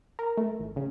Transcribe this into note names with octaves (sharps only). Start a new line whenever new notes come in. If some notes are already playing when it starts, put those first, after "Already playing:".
A#4
A3
A1
C#3